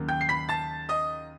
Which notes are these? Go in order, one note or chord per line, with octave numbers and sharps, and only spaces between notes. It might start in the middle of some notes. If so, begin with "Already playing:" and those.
Already playing: D#2 C#3 F#3 A#3
G5 G6
C7
B5 B6
A5 A6
D#5 D#6